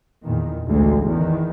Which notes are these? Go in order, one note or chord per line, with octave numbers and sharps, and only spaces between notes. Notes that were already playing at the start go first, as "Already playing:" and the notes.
E2 A#2 D#3
A1 D2 G#3
E2 D#3